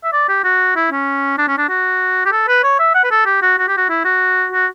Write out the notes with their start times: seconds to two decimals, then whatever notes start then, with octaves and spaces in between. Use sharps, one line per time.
0.04 E5
0.13 D5
0.29 G4
0.44 F#4
0.76 E4
0.91 C#4
1.38 D4
1.48 C#4
1.58 D4
1.69 F#4
2.26 G4
2.32 A4
2.48 B4
2.64 C#5
2.79 E5
2.95 F#5
3.04 B4
3.11 A4
3.26 G4
3.42 F#4
3.58 F#4
3.68 G4
3.77 F#4
3.89 E4
4.05 F#4
4.52 F#4